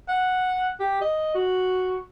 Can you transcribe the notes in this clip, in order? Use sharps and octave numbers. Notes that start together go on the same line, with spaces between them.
F#5
G4
D#5
F#4